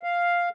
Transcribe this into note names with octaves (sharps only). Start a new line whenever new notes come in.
F5